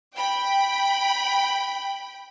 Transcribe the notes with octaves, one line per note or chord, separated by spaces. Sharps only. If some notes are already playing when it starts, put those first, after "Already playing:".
G5 B5